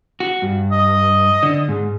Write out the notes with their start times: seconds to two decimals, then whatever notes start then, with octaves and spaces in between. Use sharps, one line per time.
0.20 F#4
0.42 G2
0.71 D#5
1.43 D3
1.69 G#2